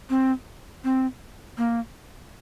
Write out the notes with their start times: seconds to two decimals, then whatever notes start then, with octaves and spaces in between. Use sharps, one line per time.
0.10 C4
0.84 C4
1.58 A#3